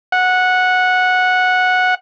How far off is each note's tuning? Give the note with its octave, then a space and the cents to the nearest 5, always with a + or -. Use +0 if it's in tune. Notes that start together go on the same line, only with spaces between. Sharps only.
F#5 -10